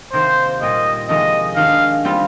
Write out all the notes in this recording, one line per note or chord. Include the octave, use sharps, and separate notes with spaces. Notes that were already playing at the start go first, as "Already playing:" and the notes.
C3 D#3 A#3 C5
A#2 G3 C4 D#4 A#4 D#5
F2 C3 D#3 G#3 D#5
D#3 G#3 D4 G4 F5
G3 C4 F4